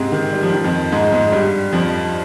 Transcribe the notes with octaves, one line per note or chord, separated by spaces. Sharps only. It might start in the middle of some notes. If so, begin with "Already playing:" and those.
Already playing: G#2 C3 G#3 C4
D#3
G3
F3
D#3
F2 F3
G#2 G#3
G#2 G#3
G2 G3
F2 F3